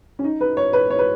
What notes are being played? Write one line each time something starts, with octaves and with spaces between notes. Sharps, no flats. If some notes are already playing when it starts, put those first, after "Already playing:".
C#4
D#4
B4
C#5
B4
C#5
B4